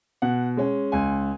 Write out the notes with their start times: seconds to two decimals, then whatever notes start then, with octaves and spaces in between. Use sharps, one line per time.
0.22 B2 F#5
0.57 G#3 C#4
0.92 C#2 G#5